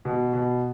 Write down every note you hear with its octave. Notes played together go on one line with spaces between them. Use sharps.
B2
B2